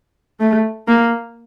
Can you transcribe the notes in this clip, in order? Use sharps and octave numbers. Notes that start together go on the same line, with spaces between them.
A3
A#3